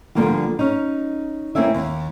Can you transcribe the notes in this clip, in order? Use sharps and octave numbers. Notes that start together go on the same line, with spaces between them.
D3 F3 G3 A#3 B3 F#4
C#4 D#4
A#3 C4 C#4 E4 E5
D#2